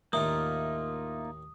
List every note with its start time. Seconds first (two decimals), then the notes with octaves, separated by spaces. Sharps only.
0.13 D#2 A2 D#3 A#3 D#4 F4 E5 D#6